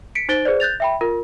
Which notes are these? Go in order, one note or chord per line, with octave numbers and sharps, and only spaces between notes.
B6 C#7 D7
D#4 C5 A6 D7 G7
G#4 B4 C5 D5
F#6 G6 A6 F7
E5 G5 B5
F4 A#4